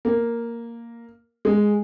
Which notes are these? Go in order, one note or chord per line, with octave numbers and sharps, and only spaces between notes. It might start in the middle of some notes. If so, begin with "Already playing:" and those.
A#3
G#3